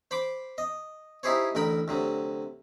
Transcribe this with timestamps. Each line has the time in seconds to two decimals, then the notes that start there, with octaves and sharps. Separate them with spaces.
0.11 C5 B5 D6
0.58 D#5
1.23 D#4 E4 G4 G#4 C5 C#5
1.55 A1 D2 A#4 G5 B5
1.88 D2 C3 F#3